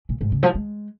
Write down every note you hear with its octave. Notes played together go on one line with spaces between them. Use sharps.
A#2
G#2
C#3
F3
G#3